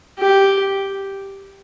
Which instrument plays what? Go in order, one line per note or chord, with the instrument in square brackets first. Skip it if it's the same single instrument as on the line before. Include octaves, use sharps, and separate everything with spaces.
[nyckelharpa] G4